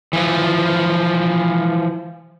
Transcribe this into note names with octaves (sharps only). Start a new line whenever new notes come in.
E3 F3